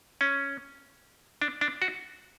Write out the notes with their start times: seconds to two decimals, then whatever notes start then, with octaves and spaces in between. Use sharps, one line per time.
0.21 C#4
1.42 D4
1.61 D4
1.82 F#4